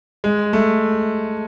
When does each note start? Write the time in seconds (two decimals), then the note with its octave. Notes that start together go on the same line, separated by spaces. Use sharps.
0.24 G#3
0.53 A3